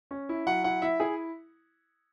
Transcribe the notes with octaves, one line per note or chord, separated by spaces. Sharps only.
C#4
E4
F#3 F#5
E4 F#5
E4 E5
E4 G#4